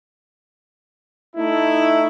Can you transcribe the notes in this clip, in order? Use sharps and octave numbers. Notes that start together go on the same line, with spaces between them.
A3 D#4 E4